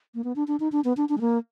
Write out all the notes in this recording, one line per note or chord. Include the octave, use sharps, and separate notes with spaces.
A#3
B3
D4
D4
D#4
D4
B3
D4
D4
G#3
A#3